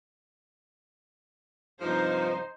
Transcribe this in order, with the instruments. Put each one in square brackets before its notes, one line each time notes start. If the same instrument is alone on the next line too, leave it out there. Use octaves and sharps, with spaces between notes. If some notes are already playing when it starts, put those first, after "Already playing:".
[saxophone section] G2 C3 F3 [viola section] D#4 C5